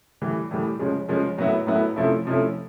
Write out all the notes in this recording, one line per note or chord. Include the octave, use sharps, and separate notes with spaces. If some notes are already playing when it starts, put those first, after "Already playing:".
A2 E3 G3
A2 E3 G3
C#3 F3 G#3 C#4
C#3 F3 G#3 C#4
A2 F#3 B3 E4
A2 F#3 B3 E4
C3 F3 A3 C#4 E4
C3 F3 A3 C#4 E4